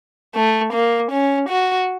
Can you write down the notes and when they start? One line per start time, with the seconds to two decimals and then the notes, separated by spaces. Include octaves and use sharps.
0.35 A3
0.73 A#3
1.12 C#4
1.49 F#4